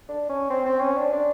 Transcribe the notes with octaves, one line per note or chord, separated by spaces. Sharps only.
D4
C#4
C4
C4
C#4
D4
D4